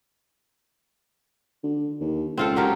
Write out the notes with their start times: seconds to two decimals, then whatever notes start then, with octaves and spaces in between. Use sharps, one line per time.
1.63 D3
2.00 D#2
2.37 C#2 C4 F4 A4
2.56 F#3 G4 A#4